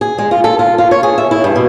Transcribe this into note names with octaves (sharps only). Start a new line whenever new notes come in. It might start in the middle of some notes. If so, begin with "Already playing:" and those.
G#4
G#3
F4
A4
F4
F4
C#5
G#4
E5
E4
G2
B2